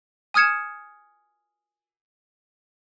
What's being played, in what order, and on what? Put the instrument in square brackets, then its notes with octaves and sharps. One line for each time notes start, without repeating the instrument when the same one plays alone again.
[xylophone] G#5 D#6 F6 G#6 C#7 E7